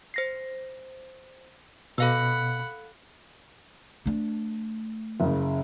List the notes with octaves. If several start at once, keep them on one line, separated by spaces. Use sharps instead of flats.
C5 A#6 C7
B2 A4 F5 F#5 B5 E6
A3 D4
F#1 C#3